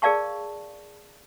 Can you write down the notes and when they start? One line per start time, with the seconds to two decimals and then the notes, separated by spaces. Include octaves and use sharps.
0.02 G#4 A#4 D5 F5 A5 C#6